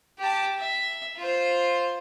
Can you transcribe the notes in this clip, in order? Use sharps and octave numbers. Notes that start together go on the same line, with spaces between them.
G4 A5
E5
F4 C5